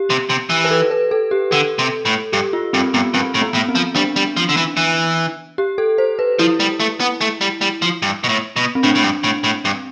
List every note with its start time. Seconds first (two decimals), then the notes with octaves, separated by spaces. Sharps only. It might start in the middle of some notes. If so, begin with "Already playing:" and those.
Already playing: G4
0.10 C3
0.29 C3
0.50 E3
0.65 B4
0.70 A4
0.91 B4
1.11 A4
1.31 G4
1.51 D3 A4
1.79 C3
2.05 A2
2.33 G2 G4
2.53 F4
2.73 G2 C4
2.94 G2 B3
3.14 G2 C4
3.34 A2
3.42 B3
3.54 A2
3.69 C4
3.75 F3
3.95 G3 D4
4.16 G3
4.37 F3
4.49 D3
4.57 E3
4.77 E3
5.58 G4
5.78 A4
5.98 C5
6.19 B4
6.39 F3 E4
6.60 G3
6.80 A3
7.00 B3
7.21 A3
7.41 G3
7.61 G3
7.82 F3
8.02 G2
8.24 B2
8.29 A2
8.56 B2
8.75 C4
8.83 A2 D4
8.95 A2
9.03 G2
9.24 A2
9.44 A2
9.65 G2